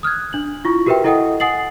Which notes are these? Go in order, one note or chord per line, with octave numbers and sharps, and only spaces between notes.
D#6 F6 F#6 G#6
D4 F#7
E4 F4 C#6
F#4 G4 A#4 B4 E5 G5
E4 A4 D#5 F#5 G5 D#6
F#5 G#5 D#6 A6 C7 F#7